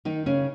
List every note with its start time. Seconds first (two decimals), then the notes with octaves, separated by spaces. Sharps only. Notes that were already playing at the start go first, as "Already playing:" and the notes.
0.05 D#3 D#4
0.26 C#3 C#4